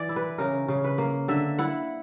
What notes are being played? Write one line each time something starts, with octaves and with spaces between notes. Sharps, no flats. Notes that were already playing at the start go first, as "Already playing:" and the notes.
Already playing: E3 D5
E4
B4
C#3 A#4
C#3
B4
A#3
D3 E5
E4 F#5